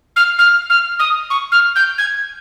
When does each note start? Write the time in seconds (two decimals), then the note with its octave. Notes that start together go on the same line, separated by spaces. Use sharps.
0.16 F6
0.39 F6
0.70 F6
0.99 D#6
1.30 C#6
1.52 F6
1.76 G6
1.98 G#6